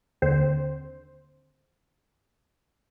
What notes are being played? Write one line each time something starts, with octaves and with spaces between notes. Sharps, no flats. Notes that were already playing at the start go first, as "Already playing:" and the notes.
D#2 D3 C4 C5